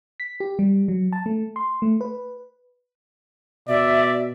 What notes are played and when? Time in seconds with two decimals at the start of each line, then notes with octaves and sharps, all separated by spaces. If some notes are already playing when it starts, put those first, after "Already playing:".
0.20 B6
0.40 G4
0.59 G3
0.88 F#3
1.13 A5
1.26 A3
1.56 C6
1.82 A3
2.01 B4
3.68 B2 D5 E5